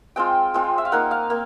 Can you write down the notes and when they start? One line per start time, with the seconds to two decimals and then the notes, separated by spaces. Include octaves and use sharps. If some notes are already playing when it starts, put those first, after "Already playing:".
0.16 G#3 C4 F4 G5
0.54 G#3 C4 F4
0.78 E5
0.85 F5
0.92 A#3 D#4 F#5
1.11 F5
1.30 A#3